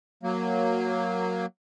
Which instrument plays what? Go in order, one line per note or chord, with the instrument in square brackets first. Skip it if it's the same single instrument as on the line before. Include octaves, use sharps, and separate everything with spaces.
[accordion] F#3 A#3